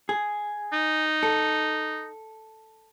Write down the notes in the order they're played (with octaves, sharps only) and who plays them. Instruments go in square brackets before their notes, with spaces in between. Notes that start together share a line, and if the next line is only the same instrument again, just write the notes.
[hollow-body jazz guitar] G#4
[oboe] D#4
[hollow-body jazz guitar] A4